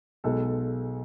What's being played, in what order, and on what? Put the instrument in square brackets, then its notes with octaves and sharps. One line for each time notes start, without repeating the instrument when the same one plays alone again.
[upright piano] B1 B2 G#3 A4